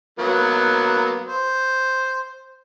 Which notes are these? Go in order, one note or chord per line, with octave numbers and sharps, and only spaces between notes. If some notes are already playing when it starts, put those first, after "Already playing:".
F#3 A#3 B3
C5